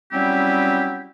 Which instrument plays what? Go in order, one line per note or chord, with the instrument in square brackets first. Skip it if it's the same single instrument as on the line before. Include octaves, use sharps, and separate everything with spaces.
[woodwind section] F#3 G3 C4 C#4 E4 G4